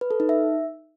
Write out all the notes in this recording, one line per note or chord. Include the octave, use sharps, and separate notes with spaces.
B4
A4
D#4
E5